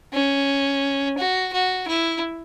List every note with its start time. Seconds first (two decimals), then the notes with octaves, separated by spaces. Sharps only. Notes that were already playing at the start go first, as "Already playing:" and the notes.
0.13 C#4
1.18 F#4
1.53 F#4
1.88 E4